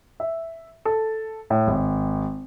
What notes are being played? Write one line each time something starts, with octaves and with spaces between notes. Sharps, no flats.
E5
A4
A2
G#1